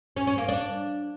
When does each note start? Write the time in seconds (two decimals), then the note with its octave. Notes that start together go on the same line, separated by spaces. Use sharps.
0.17 C#4
0.27 C#4
0.38 A#3
0.49 D4